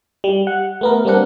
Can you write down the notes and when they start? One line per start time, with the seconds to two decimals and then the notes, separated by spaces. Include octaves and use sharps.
0.24 G3
0.47 F#5
0.81 A3 B3 A#4
1.05 G3 A#3 C4 D4 A#4 F#5